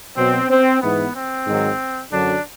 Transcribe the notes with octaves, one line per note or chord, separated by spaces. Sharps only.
B2 F#3 C4
C4
G#2 E3 B3
C4
G#2 D#3 F#3
F#2 D3 F#3 D4